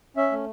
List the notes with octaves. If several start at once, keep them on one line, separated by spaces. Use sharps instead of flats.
C#4 E5
A3